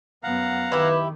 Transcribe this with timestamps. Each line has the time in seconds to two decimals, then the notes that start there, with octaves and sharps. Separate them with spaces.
0.23 F#2 B3 F5 F#5 A#5
0.72 D#3 E4 G4 B4